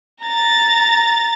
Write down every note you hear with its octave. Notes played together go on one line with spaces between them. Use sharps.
A#5 A6